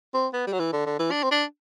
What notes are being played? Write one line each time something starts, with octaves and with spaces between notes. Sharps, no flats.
C4
B3
G3
F#3
E3
D3
D3
E3
D4
C4
D4